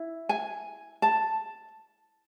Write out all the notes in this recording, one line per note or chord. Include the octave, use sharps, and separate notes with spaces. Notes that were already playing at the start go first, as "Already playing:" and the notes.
Already playing: E4
G#5
A5